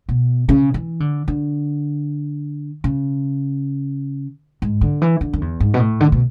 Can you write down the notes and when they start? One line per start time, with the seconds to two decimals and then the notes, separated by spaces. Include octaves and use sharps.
0.09 B2
0.49 C#3
0.74 E3
1.00 D3
1.28 D3
2.84 C#3
4.62 G#2
4.81 D3
5.02 E3
5.21 D3
5.33 F#2
5.41 E2
5.60 G#2
5.74 B2
5.80 A2
6.00 D3
6.12 B2